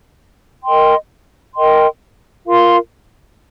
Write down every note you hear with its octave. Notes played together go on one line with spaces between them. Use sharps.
A#4 D#5 G5 C6
A#4 D#5 G5 C6
F4 A#4 F5 C6